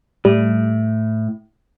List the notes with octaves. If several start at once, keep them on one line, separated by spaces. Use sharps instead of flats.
A2 G3